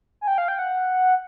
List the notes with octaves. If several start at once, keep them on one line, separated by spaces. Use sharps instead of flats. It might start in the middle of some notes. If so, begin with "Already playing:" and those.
G#5
G5
F5
G5
F#5